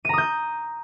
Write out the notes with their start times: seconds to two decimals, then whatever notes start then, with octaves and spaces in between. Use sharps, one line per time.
0.05 D#7
0.09 A#5
0.13 D#6
0.18 G6